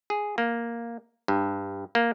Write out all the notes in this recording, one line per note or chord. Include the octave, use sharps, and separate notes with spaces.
G#4
A#3
G2
A#3